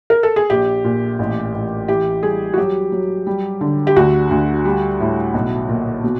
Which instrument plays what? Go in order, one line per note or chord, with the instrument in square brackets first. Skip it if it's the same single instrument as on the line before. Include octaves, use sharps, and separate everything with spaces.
[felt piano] A#4
A4
G#4
A#1 G4
A#2
A1
A1
E3 G4
G3 G#4
F#4
F#3 G4
F#3
G3
D3
G4
D2 F#4
D2
G3
A2
B1
A#2
B2